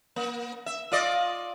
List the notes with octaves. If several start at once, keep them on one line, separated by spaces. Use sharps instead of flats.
A#3
E5
F4 D5 D#5